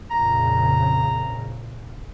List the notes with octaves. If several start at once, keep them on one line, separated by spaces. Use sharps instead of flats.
F2 A#2 C#3 A#5